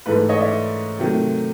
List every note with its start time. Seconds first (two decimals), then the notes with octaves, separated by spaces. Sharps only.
0.06 G#2 E3 A3 A4 B4
0.17 A4
0.29 C#5 D#5
0.40 D5 E5
0.99 C3 D#3 F#3 A3